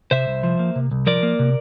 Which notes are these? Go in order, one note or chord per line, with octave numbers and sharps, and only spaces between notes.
C3 C5 E5
C2
F3
A#3
C3
C2
F3 A#4 D5
A#3
C3